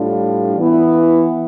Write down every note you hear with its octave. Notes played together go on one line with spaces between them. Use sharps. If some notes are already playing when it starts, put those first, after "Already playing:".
Already playing: A2 G3 D4 F4
E3 B3 E4